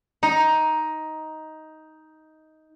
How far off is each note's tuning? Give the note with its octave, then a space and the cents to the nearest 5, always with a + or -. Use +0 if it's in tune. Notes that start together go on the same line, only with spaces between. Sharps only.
D#4 +10